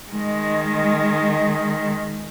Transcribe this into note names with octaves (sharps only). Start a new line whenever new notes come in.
D#3 G#3